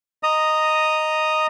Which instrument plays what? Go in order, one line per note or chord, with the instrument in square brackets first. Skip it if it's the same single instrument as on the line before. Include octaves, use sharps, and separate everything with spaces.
[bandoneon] D#5 A#5 D#6